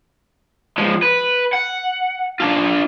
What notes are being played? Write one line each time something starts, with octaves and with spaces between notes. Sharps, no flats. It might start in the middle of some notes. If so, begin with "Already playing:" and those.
F3 G#3
B4
F#5
D4 F4